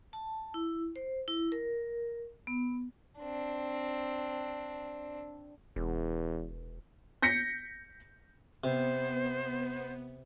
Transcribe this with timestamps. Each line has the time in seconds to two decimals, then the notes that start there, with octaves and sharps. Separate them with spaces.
0.13 A5
0.54 E4
0.96 C5
1.28 E4
1.52 A#4
2.47 B3
3.19 C4 D4
5.76 E1 E2
7.22 G6 A#6 B6 C#7
8.64 C3 B3 C5